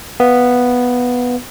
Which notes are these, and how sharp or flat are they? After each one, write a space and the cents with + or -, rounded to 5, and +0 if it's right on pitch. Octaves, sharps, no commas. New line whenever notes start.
B3 +0 F5 +0